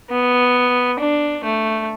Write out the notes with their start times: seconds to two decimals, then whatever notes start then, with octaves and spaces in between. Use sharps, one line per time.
0.10 B3
0.99 D4
1.45 A3